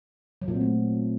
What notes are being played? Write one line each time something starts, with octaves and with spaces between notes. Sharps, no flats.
F#3
A#2
C4
A3